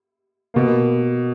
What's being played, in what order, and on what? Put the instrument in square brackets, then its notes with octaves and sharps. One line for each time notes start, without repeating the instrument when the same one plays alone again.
[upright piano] B2 A#3